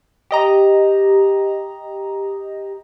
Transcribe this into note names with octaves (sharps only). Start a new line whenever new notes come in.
G4 D#5 A#5